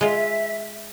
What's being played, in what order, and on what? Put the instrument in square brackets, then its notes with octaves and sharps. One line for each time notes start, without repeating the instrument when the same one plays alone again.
[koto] G#3 F4 [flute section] E5